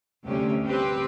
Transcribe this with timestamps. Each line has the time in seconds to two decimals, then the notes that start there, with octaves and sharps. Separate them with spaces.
0.25 D2 C3 G3 C#4 G4
0.66 C4 G4 B4